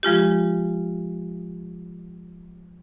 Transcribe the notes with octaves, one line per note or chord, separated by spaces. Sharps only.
F3 G#3 F4 G4